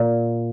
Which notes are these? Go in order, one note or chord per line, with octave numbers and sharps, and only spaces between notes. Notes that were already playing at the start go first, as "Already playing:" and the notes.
Already playing: A#2